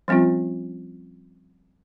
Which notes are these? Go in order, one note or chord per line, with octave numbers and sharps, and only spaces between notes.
F3 G3 C4 C#4 F4